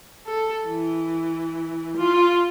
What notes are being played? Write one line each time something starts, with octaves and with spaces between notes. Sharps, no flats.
A4
E3
F4